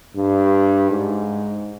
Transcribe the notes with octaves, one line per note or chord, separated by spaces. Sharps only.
G2
G#2